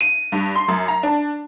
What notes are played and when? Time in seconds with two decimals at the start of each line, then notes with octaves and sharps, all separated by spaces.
0.01 D#7
0.32 G2
0.55 C6
0.68 F#2
0.88 A#5
1.03 D4